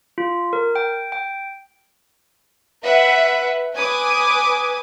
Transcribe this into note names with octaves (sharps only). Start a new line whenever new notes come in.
F4
A#4
G5
G5
B4 E5 F#5
B4 G#5 D6 D#6